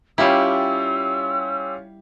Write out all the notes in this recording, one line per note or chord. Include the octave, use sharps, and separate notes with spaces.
G3 C#4 E4 F4 G4 E6